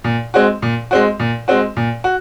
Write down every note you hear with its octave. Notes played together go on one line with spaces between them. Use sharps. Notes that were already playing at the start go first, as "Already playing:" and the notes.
A#2
G#3 C4 F#4
A#2
G#3 C4 F#4
A#2
G#3 C4 F#4
A#2
F#4